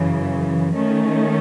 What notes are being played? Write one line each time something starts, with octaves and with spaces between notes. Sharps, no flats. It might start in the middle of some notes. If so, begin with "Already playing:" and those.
Already playing: F#2 C#3 E3
D#3 A3 C#4